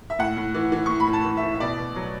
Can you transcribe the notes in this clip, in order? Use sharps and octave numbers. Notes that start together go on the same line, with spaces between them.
E5
A2 F#5
A2
E3
E3
A2 C#6
B5
A2
A5
E3
E5
E3
E5
B2 D5
B2
F#3